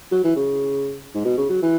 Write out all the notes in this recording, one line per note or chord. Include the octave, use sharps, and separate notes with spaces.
F#3
E3
C#3
G#2
B2
C#3
F#3
E3